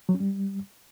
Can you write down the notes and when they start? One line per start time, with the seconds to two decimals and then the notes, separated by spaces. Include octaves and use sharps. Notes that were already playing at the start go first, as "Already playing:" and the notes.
0.09 F#3
0.14 C#4
0.20 G3